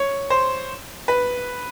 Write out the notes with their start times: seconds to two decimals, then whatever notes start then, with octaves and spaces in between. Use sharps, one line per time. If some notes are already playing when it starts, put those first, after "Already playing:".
Already playing: C#5
0.30 C5
1.08 B4